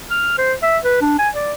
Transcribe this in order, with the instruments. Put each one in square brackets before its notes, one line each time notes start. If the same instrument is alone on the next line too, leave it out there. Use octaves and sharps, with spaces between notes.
[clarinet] F6
C5
E5
B4
D4
G#5
D5